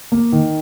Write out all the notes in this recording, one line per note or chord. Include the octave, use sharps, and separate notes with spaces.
A#3
D#3